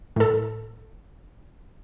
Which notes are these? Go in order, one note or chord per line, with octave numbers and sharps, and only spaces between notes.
A2 A4